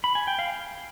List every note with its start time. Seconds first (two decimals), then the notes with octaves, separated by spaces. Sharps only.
0.04 B5
0.15 G#5
0.27 G5
0.39 F5